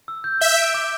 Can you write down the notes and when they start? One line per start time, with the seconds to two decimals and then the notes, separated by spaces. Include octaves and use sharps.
0.08 E6
0.24 G6
0.41 E5 G7
0.58 D7
0.74 D6